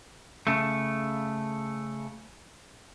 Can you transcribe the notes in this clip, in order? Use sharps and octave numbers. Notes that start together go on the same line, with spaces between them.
C#3 A3